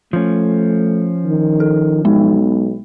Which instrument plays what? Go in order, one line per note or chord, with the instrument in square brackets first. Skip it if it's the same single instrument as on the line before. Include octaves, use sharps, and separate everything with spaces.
[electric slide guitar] F3 C#4 [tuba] A3
[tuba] D#3
[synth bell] A4
[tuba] B1 [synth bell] G#3 B3 D#4